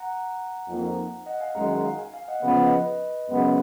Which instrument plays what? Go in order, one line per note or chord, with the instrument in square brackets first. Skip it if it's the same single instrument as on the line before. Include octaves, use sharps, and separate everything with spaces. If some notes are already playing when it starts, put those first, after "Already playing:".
Already playing: [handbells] F#5 A#5
[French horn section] F2 F3 A#3 D#4
[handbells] D#5 F#5
F5 G#5
[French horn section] F#2 D#3 G#3 [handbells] F#5 A#5
[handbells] F5 G#5
F5 G#5
F5 G#5
D#5 F#5
[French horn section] C#3 F3 B3 [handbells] D#5 F#5
[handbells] B4 D#5
B4 D#5
[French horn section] F#2 C#3 G#3 B3